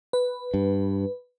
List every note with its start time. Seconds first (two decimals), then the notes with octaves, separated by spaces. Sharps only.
0.13 B4
0.54 G2